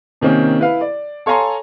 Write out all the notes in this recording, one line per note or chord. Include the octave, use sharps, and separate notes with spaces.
C3 D#3 A#3 C4 C#4
E4 B4 F5
D5
A4 C#5 F5 G#5 A#5 C6